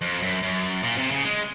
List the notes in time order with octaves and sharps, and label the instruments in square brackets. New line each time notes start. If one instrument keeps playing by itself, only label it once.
[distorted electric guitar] F2
F#2
F#2
A#2
C3
C#3
G#3